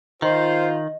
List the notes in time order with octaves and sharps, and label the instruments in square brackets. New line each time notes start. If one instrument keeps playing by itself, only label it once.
[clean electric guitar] D#3 [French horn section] F4 [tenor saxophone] C5 [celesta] D#5